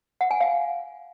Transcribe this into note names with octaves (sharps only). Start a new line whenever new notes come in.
F#5
G#5
F5